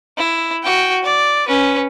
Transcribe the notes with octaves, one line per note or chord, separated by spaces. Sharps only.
E4
F#4 G5
D5
C#4 B4